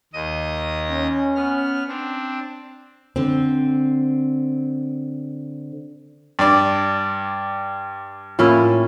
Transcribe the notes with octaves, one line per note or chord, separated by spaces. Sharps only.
D#2 D#5 D#6
C#4
B3 F6
C4 D4
D3 C4
G2 D5
A2 A#3 C#4 E4 F4